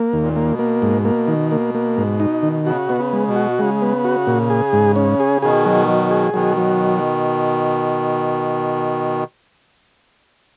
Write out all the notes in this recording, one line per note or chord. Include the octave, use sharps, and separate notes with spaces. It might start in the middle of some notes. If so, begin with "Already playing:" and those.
Already playing: A#3
D#2
A#2
A#3
B2
A#3
G#2
A#3
D#3
A#3
A#3
G#2
D#4
D#3
C#3 F#4
B2 B3
C#3
G#3
B2
F#4
C#3 G#3
B3
F#4
A#2
G#4
G#2
C#4
G#4
B2 D#3 G#4
F#3
F#3
G#4
B2 D#3 F#3
F#3